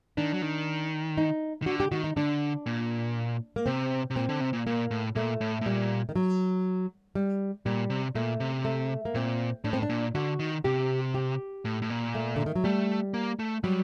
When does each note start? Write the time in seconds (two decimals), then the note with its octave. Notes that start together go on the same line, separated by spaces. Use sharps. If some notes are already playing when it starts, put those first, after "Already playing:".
0.17 D#3 D4
0.34 F#3
0.42 D#3
1.18 D#4
1.62 D#3
1.66 D3 F#4
1.80 G4
1.92 D#3 F#4
2.04 D#4
2.17 D3 D4
2.66 A#2
3.56 A#3
3.66 C3 C4
4.10 C3
4.16 A#2 C4
4.29 D3
4.41 C3
4.53 A#2
4.67 A#2 A#3
4.91 A2
5.15 A#2 A3
5.41 A2
5.61 A2
5.66 A#2 G3
6.09 D#3
6.16 F#3
7.15 G3
7.66 A#2 G3
7.90 C3
8.15 A#2 A3
8.40 C3
8.65 A3
9.05 A#3
9.14 A#2 C4
9.64 A2 D4
9.73 C4
9.83 D4
9.89 A#2
10.15 D3 F#4
10.39 D#3
10.64 C3 G4
11.14 G4
11.65 A2
11.82 A2
11.90 A#2
12.15 A3
12.36 D3
12.46 D#3
12.56 F#3
12.64 G3 A3
13.14 A#3
13.39 A3
13.64 F#3 G3